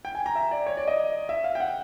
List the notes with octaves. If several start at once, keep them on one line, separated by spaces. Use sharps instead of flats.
G5
G#5
A#5
E5
D5
C#5
D5
D#5
E5
F5
G5
F#5